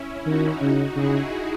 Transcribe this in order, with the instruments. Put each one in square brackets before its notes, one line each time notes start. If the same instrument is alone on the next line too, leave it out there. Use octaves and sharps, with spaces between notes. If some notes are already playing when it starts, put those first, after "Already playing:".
Already playing: [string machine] C#4 E4
[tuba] D#3 [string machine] D#4 F#4
[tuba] C#3 [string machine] D#4 F#4
[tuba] C#3 [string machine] E4 G#4